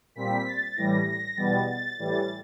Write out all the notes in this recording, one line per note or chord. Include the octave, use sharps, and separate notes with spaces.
A#2 G3 C4 B6
A6
A2 E3 G3 A#6
A#6
E2 B2 G3 B3 A6
A6
A2 E3 G3 A6